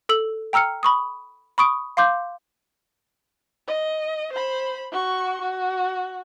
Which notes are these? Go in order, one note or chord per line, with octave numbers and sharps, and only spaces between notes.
A4 E6 F#7
G5 A#5 E6 F6 C#7
B5 C#6 D#6
B5 C#6 D#6 D7
F5 C6 D6 G6
D#5
C5 B5
F#4 C#6
F#4